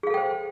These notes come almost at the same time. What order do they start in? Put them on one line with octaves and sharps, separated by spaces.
G#4 F5 A4 G5 C5